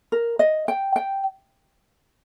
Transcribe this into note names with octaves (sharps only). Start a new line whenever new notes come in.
A#4
D#5
G5
G5